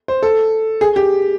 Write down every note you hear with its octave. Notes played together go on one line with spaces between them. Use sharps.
C5
A4
G#4
G4